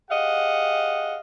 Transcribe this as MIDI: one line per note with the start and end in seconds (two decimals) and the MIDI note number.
0.10 1.18 67
0.10 1.18 68
0.10 1.18 75
0.10 1.18 77
0.10 1.18 78